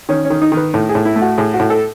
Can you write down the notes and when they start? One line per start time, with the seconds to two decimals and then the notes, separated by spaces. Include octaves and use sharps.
0.09 D#3 C#4
0.25 C#4
0.30 D#3
0.42 D#4
0.52 D#3
0.57 B4
0.74 A2
0.89 G#4
0.95 A2
1.05 E4
1.16 A3
1.21 F#4
1.38 A2 G#4
1.54 F#4
1.60 A2
1.70 A4